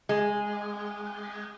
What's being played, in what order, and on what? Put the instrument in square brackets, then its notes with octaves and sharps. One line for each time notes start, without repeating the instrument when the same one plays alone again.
[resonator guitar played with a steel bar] G#3